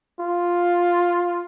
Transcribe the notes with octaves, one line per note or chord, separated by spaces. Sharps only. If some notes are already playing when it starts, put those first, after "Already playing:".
F4